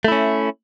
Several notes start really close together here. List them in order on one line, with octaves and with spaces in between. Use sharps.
A3 E4 C#4